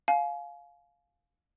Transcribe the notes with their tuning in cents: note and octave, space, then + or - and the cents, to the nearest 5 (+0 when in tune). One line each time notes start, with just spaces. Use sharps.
F5 +10 G#5 +35